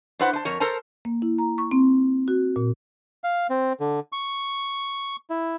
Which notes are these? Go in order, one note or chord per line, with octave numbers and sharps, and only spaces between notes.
D4 E4 B4 C5 F#5
C5 A5
F2 A#4 C#5
A4 A#4 C5 A5 A#5
A#3
E4
A#5
C#6
C4
F#4
A#2
F5
C4
D3
C#6
E4